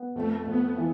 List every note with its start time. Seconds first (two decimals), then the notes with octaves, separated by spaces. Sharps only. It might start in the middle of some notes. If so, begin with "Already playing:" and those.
Already playing: B3
0.15 F2 A3
0.46 F2 B3
0.78 E3